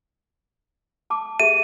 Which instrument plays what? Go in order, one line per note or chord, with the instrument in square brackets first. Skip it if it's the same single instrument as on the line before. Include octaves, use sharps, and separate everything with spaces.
[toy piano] A5 D6
[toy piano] G4 G#4 E5 [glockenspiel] D#7